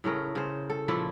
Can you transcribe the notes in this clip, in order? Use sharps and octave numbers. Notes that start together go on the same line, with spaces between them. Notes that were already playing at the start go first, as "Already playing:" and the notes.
A2 C#3 A3 A#4
C#3 C5
A4
A#2 F3 A3 E4